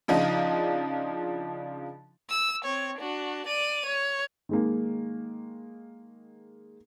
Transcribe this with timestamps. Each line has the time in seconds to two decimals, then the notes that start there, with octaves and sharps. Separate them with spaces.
0.08 C#3 F3 D4 D#4 F4
2.30 E6
2.65 C4 C#5
2.98 D4 F#4
3.47 D5 D#7
3.86 C#5
4.49 D#3 G#3 A#3